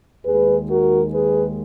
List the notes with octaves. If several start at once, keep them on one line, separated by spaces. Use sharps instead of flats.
D#2 D#3 G#3 G#4 B4
F#4 A#4
G#4 B4